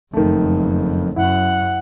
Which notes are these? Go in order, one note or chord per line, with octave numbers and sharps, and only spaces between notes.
F#1 F2 D#3 A3
F#2 E4 F#5